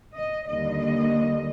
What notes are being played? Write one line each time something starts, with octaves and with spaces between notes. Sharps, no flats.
D#5
D#2 D3 G3 A#3 D#5